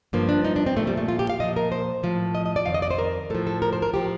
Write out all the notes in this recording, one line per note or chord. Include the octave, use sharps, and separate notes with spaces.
G2 F3 A#3
D4
D#4
D4
C4
A#2 F3 A3
G3
A3
F4
G4
F5
A#2 F3 D#5
A#4
C5
A2 F3
D#5
D#5
D5
F2 D#3 F5
D#5
D5
C5
A#4
A2 F3 A4
A4
A#4
C5
A#4
A2 F3 G4